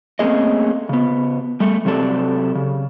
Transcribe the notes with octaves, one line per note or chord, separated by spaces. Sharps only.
A3 A#3 C4 C#4 G#4 D#5
C#3 B3
G3 A3
C3 F#3 C4 G4 A4 D5
C#3